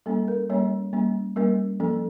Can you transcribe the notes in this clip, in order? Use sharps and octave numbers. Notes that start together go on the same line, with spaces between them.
G3 A#3 C#4 A4
A#4
G3 A#3 C#4 C#5
G3 A#3 C#4
G3 A#3 C#4 A#4
F3 A#3 C#4 A4